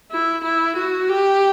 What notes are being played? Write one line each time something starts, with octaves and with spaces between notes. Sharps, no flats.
E4
E4
F#4
G4